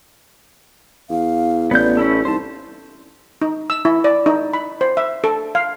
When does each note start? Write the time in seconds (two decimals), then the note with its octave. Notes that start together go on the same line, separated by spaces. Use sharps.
1.10 E2 F5
1.71 A1 B3 D5 G6
1.97 C#4 E4 A4
2.25 C2 D#4 C5 A5
3.41 D#4
3.70 E6
3.85 E4
4.04 D5
4.26 D#4
4.53 B5
4.81 C5
4.97 E5
5.24 A4
5.55 F5